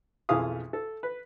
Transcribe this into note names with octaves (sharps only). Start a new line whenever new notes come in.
B1 F2 E3 G#4 F5 D#6
A4
B4